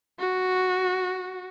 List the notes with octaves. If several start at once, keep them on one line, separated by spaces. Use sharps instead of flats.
F#4